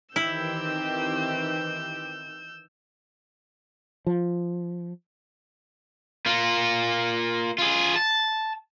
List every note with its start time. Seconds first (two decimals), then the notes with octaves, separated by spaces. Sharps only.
0.16 D#3 E3 C4 E4 G4 E6 G6
4.07 F3
6.26 A#3 F4
7.58 F4 G#4
7.96 A5